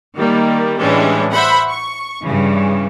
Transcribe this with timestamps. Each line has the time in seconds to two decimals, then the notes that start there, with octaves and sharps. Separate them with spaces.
0.16 D#3 G3 A#3
0.81 A2 E3 G3 G#3 C#4 D4
1.33 C5 E5 F#5 B5
1.69 C#6
2.22 G2 C#3 E3